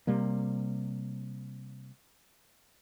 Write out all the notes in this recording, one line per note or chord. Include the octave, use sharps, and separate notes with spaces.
C3 G3 A#3